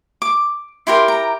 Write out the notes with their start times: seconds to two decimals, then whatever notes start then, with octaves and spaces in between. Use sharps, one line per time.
0.22 D6
0.87 E4 G4 A#4 C6
1.08 A#5